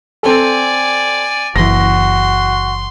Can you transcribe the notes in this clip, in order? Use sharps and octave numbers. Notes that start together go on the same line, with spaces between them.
C4 A4 D5 G#5
F#1 E3 F#4 C6 A#6